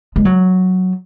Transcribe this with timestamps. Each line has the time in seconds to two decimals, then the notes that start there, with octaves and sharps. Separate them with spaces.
0.16 G#3
0.25 F#3